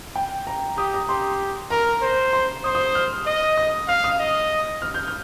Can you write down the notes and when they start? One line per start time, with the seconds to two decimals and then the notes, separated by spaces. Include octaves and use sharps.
0.16 G5
0.47 A#5
0.77 G4 D#6
0.94 A#5
1.09 G4 C6
1.70 A#4 A#5
2.02 C5
2.33 C6
2.64 C5 D#6
2.75 D#6
2.95 F6
3.27 D#5
3.58 D#6
3.88 F5 F6
4.04 D#6
4.19 D#5
4.82 F6
4.94 G6
5.08 F6